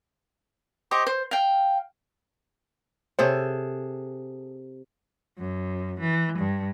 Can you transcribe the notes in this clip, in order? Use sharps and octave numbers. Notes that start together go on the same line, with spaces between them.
G4 C5 D#5 C#6
C5
F5 G5
C3 G#4 A4 C5 C#5
F#2
E3
G2